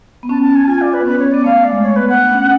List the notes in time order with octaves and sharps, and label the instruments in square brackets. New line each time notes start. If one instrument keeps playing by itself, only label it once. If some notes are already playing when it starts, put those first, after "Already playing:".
[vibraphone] B3
[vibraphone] C#4 [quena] A5
[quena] A5
G#5
A5
[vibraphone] F4 [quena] G#5
[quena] D5
B4
[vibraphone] B3
[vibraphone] C#4 [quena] B4
[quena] C#5
[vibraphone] B3 [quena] D5
[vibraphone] A3 [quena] F5
[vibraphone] A3
[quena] D5
[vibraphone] G#3
[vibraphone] A3 [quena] C#5
[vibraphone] B3 [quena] B4
[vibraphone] A3 [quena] F#5
[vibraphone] D4
C#4